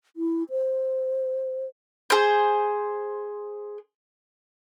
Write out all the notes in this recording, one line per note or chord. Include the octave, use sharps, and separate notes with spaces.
E4
C5
G#4 C5